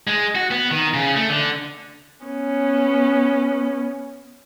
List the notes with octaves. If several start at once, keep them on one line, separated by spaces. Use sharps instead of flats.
G#3
F#4
B3
D#3
C#3
A3
D3
B3 C#4